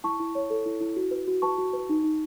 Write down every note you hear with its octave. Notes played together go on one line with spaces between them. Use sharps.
E4 A5 C#6
E4
C#5
A4
E4
E4
F#4
B4
F#4
B4 A5 C#6
F#4
B4
D#4
D#4